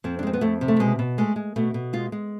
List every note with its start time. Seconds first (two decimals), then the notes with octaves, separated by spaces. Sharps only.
0.04 F2 C4
0.19 D4
0.23 G#3 C4
0.33 B3
0.41 F2 A3
0.61 C3
0.68 A3
0.80 B2 G#3
0.99 B2
1.18 G#3 A3
1.36 G#3
1.56 B2 A3
1.74 B2
1.93 G#3 F4
2.12 G#3